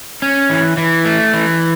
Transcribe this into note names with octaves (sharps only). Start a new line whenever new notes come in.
C#4
E3
E3
A3
E3